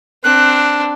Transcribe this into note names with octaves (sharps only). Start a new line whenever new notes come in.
C4 D4 F#6